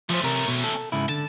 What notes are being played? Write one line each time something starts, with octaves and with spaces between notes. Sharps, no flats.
F3 A3 C#4 C5
C3 A#4
B2
A4
G#2 C#3 E4
D3 A5